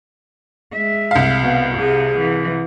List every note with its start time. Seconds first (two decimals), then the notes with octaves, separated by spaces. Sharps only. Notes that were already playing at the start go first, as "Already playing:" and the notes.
0.74 G#3 E5
1.11 C2 F5
1.42 B2
1.78 C3 G#4
2.18 E3